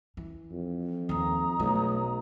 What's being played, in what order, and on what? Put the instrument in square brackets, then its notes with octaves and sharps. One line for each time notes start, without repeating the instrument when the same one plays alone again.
[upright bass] E3
[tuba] F2
[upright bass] D#2 A#3 [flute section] A#5 D#6
[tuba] B1 [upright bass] A3 E4